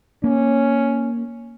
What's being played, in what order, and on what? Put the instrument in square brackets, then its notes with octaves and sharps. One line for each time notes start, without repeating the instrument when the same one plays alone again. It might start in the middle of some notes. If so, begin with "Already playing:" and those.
[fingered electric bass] A#3 [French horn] C#4